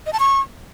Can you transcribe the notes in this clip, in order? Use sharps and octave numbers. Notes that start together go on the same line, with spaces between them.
D#5
A5
C#6